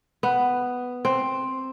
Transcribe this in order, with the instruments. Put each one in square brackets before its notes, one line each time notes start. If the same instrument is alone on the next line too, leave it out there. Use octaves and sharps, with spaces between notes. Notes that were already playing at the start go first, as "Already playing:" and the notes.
[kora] B3
C4